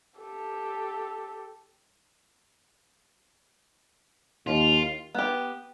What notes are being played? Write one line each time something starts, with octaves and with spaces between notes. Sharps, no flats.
G4 A4
D#2 F4
B3 G4